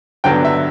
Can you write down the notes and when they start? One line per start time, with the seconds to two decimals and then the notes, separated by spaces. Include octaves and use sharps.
0.24 G2 D3 F#3 B3 G5
0.45 E5